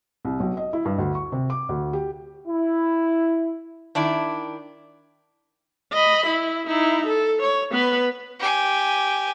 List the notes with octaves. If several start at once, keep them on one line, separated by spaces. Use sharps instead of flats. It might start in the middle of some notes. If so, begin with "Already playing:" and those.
C2
B1
D#5
E4
G2
D2
C#6
C3
D6
D2
G4
E4
D#3 D4 E4
D#5 B5
E4
D#4 E4
A4
C#5
B3 B4
G4 G#5